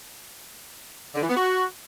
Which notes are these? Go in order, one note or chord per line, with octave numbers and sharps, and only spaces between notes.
D3
E3
B3
F#4